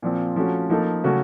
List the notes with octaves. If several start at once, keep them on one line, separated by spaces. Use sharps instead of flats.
A#2 F3 C4
F3 A3 C#4 F#4
F3 A#3 D#4 A4
C#3 F#3 A3 C#4 F#4